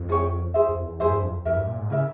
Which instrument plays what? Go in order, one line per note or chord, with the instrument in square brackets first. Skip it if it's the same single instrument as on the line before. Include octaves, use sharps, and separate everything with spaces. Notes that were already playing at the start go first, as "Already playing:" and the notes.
Already playing: [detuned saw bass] F2
[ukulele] E4 G#4 C#5 G5
E4 G#4 C5 E5
[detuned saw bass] F2
E2
[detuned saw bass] F2 [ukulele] E4 G#4 C5 E5
[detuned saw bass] G2
F2
[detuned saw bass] F2 [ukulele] E4 A#4 E5
[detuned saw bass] G2
A#2
G#2
[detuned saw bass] C#3 [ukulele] E4 A#4 E5